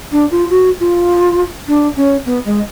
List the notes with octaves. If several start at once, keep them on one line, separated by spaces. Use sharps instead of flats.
D4
F4
F#4
F4
D4
C#4
B3
G#3